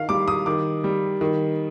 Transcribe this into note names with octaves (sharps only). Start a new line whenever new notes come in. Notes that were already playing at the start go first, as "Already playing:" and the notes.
Already playing: D#3 F5
G3 D6
D#6
D#3 D6
G3
D#3